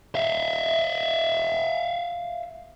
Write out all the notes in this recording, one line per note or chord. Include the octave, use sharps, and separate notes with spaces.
E5 F5